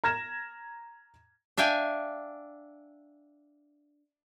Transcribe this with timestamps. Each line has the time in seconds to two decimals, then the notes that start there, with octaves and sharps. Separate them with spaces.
0.04 A#5 F6 G#6 A#6 E7
1.57 D4 E5 F5 G5 G#5